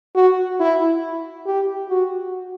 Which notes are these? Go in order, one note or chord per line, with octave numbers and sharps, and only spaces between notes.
F#4
E4
G4
F#4